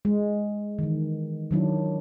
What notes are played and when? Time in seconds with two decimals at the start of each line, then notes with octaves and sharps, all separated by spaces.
0.05 G#3
0.79 D#3 E3
1.51 D#3 F#3 D4 E4